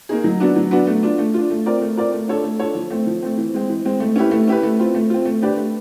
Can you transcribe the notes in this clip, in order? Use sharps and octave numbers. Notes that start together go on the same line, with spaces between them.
A#3 D#4 G#4
F#3
B3 D4 F#4
F#3
B3 D4 F#4
A3
D4 F4
A3
D4 F4
A3
C4 F4 A#4 D5
A3
C4 F4 A#4 D5
A3
D4 F4 A4 C#5
A3
D4 F4 A4 C#5
F3
A3 C4
F3
A3 C4
E3
G#3 C4
E3
G#3 C4
A3
C#4 E4 G4 B4
A3
C#4 E4 G4 B4
A3
C4 F4
A3
C4 F4
A3
D4 G4 B4 D5
A3